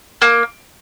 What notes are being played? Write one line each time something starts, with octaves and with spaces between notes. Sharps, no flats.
A#3